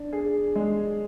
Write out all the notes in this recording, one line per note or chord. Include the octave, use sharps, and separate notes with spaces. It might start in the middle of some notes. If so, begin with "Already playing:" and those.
Already playing: D4
G#4
G#3